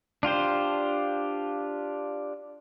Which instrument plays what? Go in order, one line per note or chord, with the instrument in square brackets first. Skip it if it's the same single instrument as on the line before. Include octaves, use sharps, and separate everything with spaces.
[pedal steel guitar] D4 F4 G4 C5